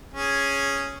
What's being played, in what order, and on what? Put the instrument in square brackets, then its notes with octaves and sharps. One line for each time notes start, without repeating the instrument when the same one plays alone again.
[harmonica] C#4 G#4